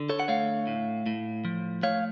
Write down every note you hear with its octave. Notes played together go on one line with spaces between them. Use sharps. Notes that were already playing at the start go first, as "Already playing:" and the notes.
Already playing: D3
A4 C#5
F#5
A3 C#5 F5
A2
A2
F3
A3 C#5 F5